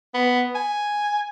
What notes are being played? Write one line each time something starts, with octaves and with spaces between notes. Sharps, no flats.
B3
G#5